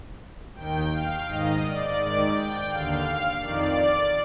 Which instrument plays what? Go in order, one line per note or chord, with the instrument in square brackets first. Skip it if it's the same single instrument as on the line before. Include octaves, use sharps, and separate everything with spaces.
[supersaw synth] D#2 D#3 G5
F5
G#2 D#3 D#5
D5
G#2 D#3
G5
D#2 D3 F5
F2 D#3 D5